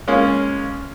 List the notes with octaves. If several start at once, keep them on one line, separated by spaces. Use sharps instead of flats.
G#3 A#3 C#4 F4